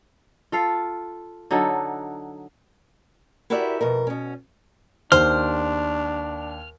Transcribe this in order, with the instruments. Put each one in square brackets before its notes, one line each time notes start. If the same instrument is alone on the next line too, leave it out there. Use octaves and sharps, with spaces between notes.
[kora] F4 A4 F5
D3 F#3 D#4 A4
[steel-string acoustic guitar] E4 F#4 G4 A#4 D5 E5
F2 B2 A#4
B2 C#4
[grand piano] D#2 [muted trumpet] D4 [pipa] C5 [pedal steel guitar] F6